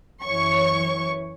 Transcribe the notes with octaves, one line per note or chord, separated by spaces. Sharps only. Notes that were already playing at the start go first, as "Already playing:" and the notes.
F#2 E3 C#5 C#6